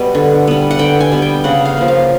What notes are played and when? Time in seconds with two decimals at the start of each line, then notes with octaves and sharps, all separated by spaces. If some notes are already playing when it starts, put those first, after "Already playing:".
Already playing: B2 G3 B3
0.15 D3
0.47 G3 B3
0.71 F#5
0.79 D3 G5
1.01 G#5
1.12 G3 B3
1.22 G5
1.44 C#3 F#5
1.65 F5
1.77 F3 A#3
1.88 F5